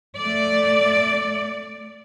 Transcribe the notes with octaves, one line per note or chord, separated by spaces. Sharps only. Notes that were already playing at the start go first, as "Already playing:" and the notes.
A3 D5